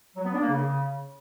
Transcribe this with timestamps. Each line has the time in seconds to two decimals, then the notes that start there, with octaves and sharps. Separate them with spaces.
0.16 F#3
0.24 B3
0.33 D4
0.41 A#3
0.50 C#3